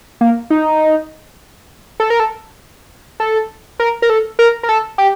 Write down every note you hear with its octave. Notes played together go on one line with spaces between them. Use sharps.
A#3
D#4
A4
A#4
A4
A4
A#4
A#4
A4
A#4
A#4
A4
G4